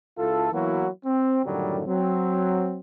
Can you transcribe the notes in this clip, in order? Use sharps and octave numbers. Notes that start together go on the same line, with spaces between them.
C#2 E4 F4 A4
E3 F#3 A#3 B3 E4 F#4
C4
F#2 A2 D3 D#3 F#3 G3
F#3 C4